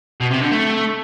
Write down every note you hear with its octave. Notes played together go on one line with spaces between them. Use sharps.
B2
C3
D3
A3